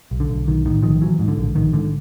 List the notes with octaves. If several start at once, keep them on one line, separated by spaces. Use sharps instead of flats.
B1
D3
B1
B1 D#3
A2 D#3
B1 D#3 F3
A#1 E3 F#3
G#2
D3
A#1
A#1 D#3
G#2 D3